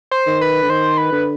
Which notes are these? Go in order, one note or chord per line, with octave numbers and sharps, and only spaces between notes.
C5
D#3
B4
D3
D#3 C5
B4
D3